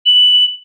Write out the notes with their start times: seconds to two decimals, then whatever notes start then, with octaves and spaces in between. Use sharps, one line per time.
0.06 F#7